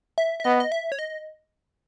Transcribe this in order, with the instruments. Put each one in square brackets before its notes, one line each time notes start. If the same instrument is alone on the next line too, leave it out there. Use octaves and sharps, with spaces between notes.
[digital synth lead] E5
E5
[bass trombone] B3 [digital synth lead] D#5
[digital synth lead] D#5
E5
C#5
D#5